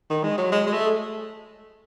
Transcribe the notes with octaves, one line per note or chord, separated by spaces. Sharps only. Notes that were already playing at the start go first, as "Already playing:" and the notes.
D#3
G#3
F#3
G#3
G#3
A3